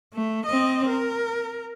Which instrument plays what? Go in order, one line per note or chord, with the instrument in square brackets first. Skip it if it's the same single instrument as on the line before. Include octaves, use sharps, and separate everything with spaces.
[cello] A3
C4 D#5
A#4